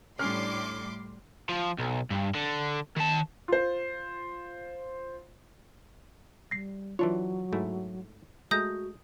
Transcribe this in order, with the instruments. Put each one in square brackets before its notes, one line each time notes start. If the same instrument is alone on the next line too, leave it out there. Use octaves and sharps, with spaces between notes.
[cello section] A2 G3 [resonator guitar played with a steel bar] C#4 D4 [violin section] C6 D6 [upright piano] F6
[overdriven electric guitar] F3
B1
G2
D3
D#3 A5
[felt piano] F4 C5
[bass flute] G3 [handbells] A#6 C7
[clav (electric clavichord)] E3 D4 C#5 [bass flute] F#3 [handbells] F4
[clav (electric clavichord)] G#2 A3 E4
[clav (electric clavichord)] G#3 A3 A#5 [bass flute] F#4 [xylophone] D#6 G6 A#6